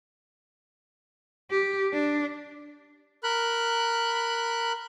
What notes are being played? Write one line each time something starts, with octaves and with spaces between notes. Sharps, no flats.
G4
D4
A#4 B5 F#6